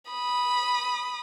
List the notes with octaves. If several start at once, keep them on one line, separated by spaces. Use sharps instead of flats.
B5 D#6